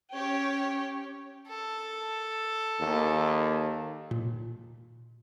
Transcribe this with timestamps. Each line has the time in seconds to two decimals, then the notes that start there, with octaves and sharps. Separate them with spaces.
0.13 C#4 G4 C#5
1.48 A4
2.79 D#2
4.11 A#2